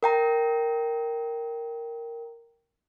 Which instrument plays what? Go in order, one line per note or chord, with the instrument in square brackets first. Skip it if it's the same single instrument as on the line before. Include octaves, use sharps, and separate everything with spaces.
[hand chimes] A#4 G5 A#5